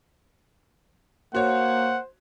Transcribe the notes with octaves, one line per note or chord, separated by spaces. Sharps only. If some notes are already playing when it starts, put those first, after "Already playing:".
A#3 F#4 C5 C#5 F#5